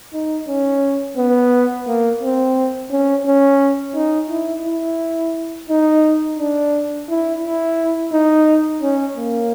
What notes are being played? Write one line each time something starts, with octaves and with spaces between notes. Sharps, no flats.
D#4
C#4
B3
A#3
C4
C#4
C#4
D#4
E4
E4
D#4
D4
E4
E4
D#4
C#4
A#3